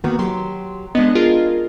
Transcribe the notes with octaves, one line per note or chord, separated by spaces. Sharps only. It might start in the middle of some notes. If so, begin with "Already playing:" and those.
D#3 A#3 B3 F#4
F#3 G4 C6
G#3 B3 D4 D#5
F4 G#4 A#4